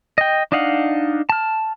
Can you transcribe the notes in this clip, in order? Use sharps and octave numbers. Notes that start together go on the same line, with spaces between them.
D#5 G5
D4 D#4 D#5 F5 F#5
A5 F6